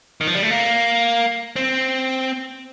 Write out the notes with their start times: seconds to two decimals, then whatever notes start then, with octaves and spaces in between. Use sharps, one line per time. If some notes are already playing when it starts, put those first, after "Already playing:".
0.21 D#3
0.27 F3
0.35 G3
0.43 A3
0.50 A#3
1.56 C4